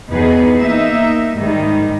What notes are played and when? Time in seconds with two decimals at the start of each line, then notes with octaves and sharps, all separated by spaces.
0.11 E2 B2 B3 D#4 G#4 B4
0.59 A#3 D#4 E5
1.35 G#2 D#3 G3 G#3 D#4